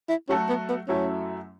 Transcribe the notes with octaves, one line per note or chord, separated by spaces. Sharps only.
E4
F#3 A3 C#4 F#4 A4
B3
B3
F#2 F#3 A3 C#4 E4